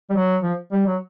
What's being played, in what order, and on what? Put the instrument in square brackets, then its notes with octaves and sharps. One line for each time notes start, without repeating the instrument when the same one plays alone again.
[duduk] G3
F#3
F3
G3
F#3